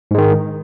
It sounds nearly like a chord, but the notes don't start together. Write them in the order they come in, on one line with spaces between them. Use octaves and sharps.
G#2 G#3 D#3